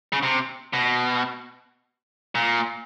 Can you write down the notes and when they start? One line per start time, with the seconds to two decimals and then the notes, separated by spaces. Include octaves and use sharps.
0.13 C#3
0.23 C3
0.73 B2
2.35 A#2